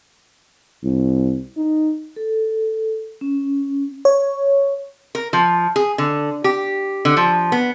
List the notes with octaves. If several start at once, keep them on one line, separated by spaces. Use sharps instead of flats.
C2
D#4
A4
C#4
C#5
A#4
F3
G#4
D3
G4
D3
F3
B3